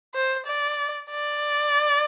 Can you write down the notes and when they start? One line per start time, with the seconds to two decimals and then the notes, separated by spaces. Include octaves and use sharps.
0.14 C5
0.46 D5
1.11 D5